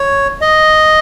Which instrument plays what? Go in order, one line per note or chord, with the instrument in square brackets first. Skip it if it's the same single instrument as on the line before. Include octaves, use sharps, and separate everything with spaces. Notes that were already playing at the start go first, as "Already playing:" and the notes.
Already playing: [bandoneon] C#5
D#5